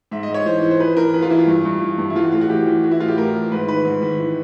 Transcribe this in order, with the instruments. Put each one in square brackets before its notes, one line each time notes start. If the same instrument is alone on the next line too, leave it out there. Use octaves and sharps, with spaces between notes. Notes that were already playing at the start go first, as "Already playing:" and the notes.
[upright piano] G#2 E5
D#5
G#2
C#5
E3 C5
E3
C5
F2 B4
E3 A#4
F2 B4
F4
E3 E4
F4
G2
G2
E3
G2
E4
E3 F4
F#4
A2 F4
F#4
E3 G4
E3
E3 F#4
E4
A2 F4
G4
A2 A#4
E3
G#2 B4
D#3 B4
G#2
D#3
E3